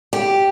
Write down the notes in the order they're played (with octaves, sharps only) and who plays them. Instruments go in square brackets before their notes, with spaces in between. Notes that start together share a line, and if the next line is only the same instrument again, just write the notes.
[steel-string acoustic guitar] G4